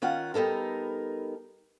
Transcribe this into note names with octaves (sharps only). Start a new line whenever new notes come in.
D#3 C#4 F4 F#5
G3 B3 D#4 A4 A#4